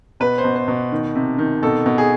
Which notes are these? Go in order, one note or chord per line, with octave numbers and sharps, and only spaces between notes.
B2 B4
C5
B2
C5
B2
D#3
C3
D#3
B2 A4
B2
G#4